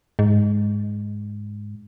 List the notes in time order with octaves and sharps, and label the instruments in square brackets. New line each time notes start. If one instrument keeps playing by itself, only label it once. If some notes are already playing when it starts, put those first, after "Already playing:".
[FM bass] G#2